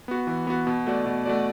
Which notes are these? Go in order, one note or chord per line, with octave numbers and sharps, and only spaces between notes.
B3 F#4
E3
B3 F#4
B2
A3 F#4 D5
B2
A3 F#4 D5